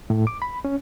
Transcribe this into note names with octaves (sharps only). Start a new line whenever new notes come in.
A2
D6
B5
C#4